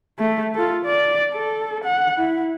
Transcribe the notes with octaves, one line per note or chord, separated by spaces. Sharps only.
A3
F4 A4
D5
A4
F#5
E4